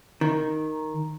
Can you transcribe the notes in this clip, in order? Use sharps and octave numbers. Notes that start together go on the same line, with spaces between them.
D#3